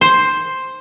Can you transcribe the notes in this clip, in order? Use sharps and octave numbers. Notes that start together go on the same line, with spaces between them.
C5